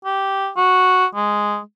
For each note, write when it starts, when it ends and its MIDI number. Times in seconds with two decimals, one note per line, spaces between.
0.05 0.49 67
0.57 1.05 66
1.15 1.60 56